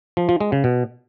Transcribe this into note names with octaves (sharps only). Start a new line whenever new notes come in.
F3
F3
G#3
C#3
B2